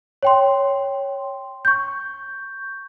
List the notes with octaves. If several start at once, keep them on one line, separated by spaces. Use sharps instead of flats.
C#5 G5 C6
C#6 G6